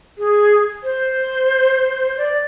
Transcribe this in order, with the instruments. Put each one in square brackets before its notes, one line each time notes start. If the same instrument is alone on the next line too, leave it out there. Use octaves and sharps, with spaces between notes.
[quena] G#4
C5
D5